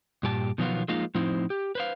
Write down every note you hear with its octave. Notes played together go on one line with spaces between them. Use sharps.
G2 A#2 G4 A5
B2 D#3 F3 F#3 B3 F4
F3 G#3 A#3 D#4 F4
A2 F3 C4 D#4 E4 C5
G4
B4 C5 F5